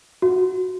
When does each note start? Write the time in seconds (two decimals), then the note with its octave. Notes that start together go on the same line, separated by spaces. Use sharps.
0.22 F#4